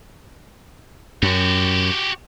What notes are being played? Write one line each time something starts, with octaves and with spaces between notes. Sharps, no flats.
F#2 F#4 G4